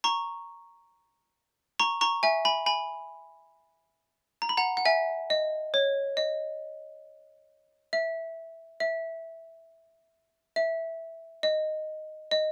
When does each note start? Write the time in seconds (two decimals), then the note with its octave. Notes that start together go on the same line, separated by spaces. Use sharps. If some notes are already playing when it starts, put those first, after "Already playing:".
0.04 A#5 C#6
1.80 A#5 C#6
2.01 A#5 C#6
2.23 E5 G#5
2.45 G#5 B5
2.66 G#5 B5
4.42 A#5
4.49 B5
4.57 F#5 A#5
4.77 F#5
4.85 E5 G#5
5.30 D#5
5.74 C#5
6.17 D#5
7.93 E5
8.80 E5
10.56 E5
11.43 D#5
12.31 D#5